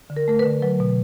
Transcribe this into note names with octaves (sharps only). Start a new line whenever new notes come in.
D3
A#4
A3 A#4
B4
D3
F#3 B4
B2